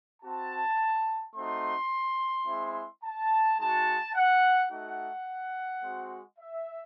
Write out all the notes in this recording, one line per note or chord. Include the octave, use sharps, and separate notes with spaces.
C4 F#4 A5
A3 C4 D#4 F#4 C6
G#3 C4 E4
A5
G#3 D#4 F#4 A5
F#5
A3 D#4 F#4 F#5
G#3 C4 F#4
E5